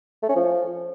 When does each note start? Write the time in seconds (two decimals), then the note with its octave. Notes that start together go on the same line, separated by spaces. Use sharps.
0.23 A3
0.29 C#4
0.35 F3